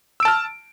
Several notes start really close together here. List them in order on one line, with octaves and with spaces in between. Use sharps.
E6 D7 A5 F6